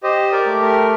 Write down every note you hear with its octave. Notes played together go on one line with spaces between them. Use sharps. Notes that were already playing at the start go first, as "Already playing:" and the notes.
G4 C5 D#5
A#4 D5
A3
A#4